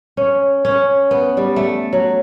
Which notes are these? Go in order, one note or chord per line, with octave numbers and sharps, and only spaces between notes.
C#4
C#4
B3
G3
A3
F#3